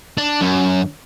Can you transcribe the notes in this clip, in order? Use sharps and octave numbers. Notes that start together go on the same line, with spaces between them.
D4
F#2